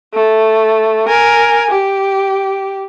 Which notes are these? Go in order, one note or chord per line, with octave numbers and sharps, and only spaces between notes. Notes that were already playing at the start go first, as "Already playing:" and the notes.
A3
A#4 G#5
G4